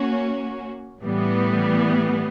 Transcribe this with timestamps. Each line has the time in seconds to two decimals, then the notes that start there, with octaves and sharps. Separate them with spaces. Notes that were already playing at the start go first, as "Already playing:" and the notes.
Already playing: A#3 C#4 F#4
1.04 A2 E3 G3 B3